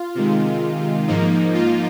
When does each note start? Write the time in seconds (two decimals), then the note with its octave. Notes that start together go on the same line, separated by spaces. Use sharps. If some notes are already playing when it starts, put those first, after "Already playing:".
Already playing: F4
0.15 C3 D#3 G#3
1.07 G#2 F3 A#3 D#4
1.54 F4